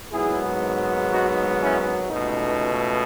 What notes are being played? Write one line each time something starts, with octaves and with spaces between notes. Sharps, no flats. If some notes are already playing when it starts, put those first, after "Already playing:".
G#1 G#2 F#3 B3 E4 G#4
D#4 F#4
C#4 E4
C#2 B2 A3 D#4